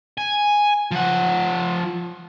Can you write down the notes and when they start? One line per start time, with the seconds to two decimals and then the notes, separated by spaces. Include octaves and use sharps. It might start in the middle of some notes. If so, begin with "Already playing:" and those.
0.18 G#5
0.91 F3 F#5